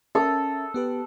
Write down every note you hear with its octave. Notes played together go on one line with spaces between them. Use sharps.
C#4 A4 A#4 E5 D#6
B3 G4 B4